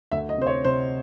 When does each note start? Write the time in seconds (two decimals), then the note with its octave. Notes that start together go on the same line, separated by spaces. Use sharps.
0.12 D2 E5
0.29 D#5
0.38 C3 C5
0.47 C#5
0.65 C3 C5